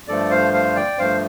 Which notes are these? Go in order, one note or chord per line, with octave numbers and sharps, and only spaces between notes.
G2 F3 A3 A4 D5
C5 F5
C5 F5
D5 G5
G2 F3 A3 C5 F5